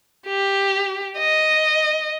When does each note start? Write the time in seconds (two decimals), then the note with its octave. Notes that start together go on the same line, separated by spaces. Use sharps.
0.27 G4
1.18 D#5